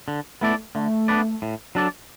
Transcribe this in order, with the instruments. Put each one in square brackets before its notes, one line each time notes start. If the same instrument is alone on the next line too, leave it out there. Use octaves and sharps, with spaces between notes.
[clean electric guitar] D3
[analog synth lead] A3 [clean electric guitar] B3 E4 A4 D5
[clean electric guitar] D3 [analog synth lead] A3
[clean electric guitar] B3 D4 B4 D5
A2
F#3 D4 A4 D5